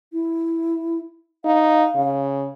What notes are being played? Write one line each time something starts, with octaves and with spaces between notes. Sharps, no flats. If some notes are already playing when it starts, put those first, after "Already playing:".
E4
D#4 F5
C#3